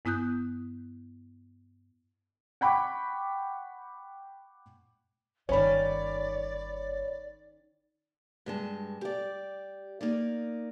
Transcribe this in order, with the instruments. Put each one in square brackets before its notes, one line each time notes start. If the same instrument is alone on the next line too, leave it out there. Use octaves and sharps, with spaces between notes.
[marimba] G2 B3 E4 D#6 F#6 G6
[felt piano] F#5 G5 B5 C#6 D6
[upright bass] G1 D#4 [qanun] D#3 C#4 [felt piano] C#5 B5 [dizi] D5
[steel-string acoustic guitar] G2 G#3 A5
G4 D5
A#3 D#4 D5